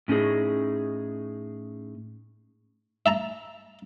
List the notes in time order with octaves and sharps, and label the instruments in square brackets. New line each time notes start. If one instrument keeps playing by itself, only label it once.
[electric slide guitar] A2 C#4 D#4 G#4
[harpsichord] E5 A5 A#5